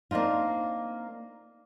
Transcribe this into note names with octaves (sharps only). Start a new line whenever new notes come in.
A#3 C4 D4 D#4 F4